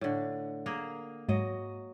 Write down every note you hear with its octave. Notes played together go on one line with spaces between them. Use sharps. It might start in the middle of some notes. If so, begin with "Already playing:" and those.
A2 D3
A#3 G#4 A#4
G#2 F#3 D#5